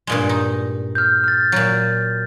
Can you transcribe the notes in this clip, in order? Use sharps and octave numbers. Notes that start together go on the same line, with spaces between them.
G2 A#2 G#3
D#4
F6 G6
F6 A6
A#2 F#3